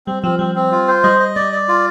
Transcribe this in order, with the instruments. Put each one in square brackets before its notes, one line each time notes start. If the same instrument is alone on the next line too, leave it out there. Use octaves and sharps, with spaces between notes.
[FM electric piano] G3 [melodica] C4
[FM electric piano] F3 [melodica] C4
[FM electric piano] G3 [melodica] C4
[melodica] C4
F4
C5
[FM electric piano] G3 [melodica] D#5
[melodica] D#5
[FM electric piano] G3 [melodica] D5
[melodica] D5
F4